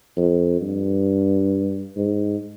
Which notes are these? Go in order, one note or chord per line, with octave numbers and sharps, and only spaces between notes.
F2
G2
G#2